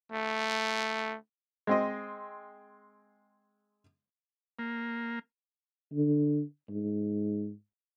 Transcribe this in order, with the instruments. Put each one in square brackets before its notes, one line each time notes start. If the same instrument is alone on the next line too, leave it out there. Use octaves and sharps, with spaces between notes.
[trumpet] A3
[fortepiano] G#3 C4 D#5
[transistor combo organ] A#3
[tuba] D3
G#2